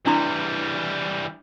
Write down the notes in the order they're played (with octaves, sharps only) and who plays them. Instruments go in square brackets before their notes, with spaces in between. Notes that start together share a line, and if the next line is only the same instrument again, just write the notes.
[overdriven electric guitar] E3 G3 [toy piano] D4 E4 C6